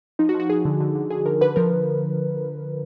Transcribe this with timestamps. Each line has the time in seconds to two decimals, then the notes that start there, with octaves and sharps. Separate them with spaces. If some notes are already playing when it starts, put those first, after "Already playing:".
0.19 F3 D#4
0.29 F#4
0.34 F3
0.40 F#4
0.50 F3 G#4
0.65 D3
0.80 D3
0.95 D3
1.10 D3 G#4
1.26 D3 A#4
1.41 D3 B4
1.56 F3 A#4